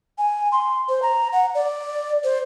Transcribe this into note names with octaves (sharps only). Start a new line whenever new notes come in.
G#5
C6
C5
A#5
F#5
D5
C5